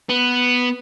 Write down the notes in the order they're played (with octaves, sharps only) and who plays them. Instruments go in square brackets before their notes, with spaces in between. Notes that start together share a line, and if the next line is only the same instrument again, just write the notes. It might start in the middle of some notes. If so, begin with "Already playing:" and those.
[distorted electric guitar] B3